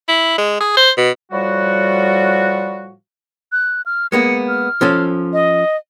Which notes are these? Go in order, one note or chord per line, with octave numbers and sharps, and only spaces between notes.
E4
G#3
G#4
C5
B2
A2 F3 G3 F#4
F#6
F6
G#3 A#3 B3 C#7
F6
F3 C#4 A4
D#5